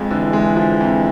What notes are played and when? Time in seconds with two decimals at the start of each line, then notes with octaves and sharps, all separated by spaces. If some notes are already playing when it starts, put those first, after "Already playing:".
Already playing: F2 F3 G#3
0.10 D3 E3
0.33 G#3
0.56 F3
0.81 F2